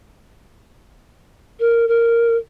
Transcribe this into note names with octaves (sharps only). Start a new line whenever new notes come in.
A#4
A#4